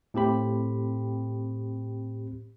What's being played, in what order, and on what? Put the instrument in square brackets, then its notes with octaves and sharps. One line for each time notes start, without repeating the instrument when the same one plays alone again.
[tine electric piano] A2 C4 G4 B5